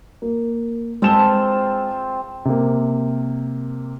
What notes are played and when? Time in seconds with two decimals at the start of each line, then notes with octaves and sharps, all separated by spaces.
0.22 A#3
1.02 G#3 C4 F4 A5 E7 G7
2.45 C3 A#3